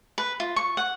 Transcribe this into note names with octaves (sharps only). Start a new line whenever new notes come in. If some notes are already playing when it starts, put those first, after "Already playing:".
B4
F4
C#6
F#5